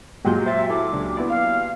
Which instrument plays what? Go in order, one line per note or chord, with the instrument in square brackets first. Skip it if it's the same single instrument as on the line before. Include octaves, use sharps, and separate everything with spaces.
[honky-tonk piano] A#2 F#3 G4 [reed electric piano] G#3 F#5 G6
[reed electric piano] C5 A6 [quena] E5
[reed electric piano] E4 A4 [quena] D6
[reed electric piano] C#2 D4
B3 E4 D5
[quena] F5